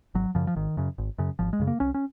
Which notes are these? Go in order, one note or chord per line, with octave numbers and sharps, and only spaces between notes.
G#1 F#3
F#2 C#3 F3
F3
G#1 D#3
F#2 C#3
G#1
F#2 C#3
G#1 F3
G#3
F#2 C#3
A#3
C2 C#4
C#4